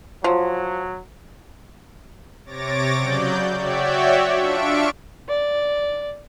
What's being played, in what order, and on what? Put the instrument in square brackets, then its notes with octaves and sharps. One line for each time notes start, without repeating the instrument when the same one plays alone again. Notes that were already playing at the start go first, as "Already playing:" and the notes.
[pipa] F3 [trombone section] F#3
[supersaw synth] C3 C#5 D6 A6 A#6 D7
C#3 F#3 D5 G6
F#4 C#5 D5 E5 G5
D4 F4 E5 C#6 D7
[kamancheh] D5